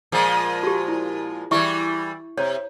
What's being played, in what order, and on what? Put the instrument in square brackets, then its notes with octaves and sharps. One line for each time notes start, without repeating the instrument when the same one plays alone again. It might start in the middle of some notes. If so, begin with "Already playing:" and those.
[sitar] A#2 F3 G#3
[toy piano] F#4 G4
E4
[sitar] E3 G3 [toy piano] E4 E5 C#6
[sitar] C3 [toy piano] C#5